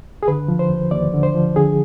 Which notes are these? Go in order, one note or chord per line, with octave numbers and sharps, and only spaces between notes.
G#4
D3 B4
F3
C5
D#2
D#2 D5
D3
C5
F3
D3 G#4